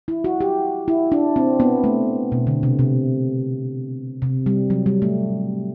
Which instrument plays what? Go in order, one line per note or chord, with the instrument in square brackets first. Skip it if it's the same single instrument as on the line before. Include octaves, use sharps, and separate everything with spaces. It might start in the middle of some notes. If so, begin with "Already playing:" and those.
[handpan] E4
F#4
G4
E4
D4
C4
B3
A3
B2
D3
C3
C3
C3
G3
F#3
G3
A3